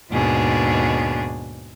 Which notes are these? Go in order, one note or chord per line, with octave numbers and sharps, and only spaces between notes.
D#2 G#2 B2 D4 G#4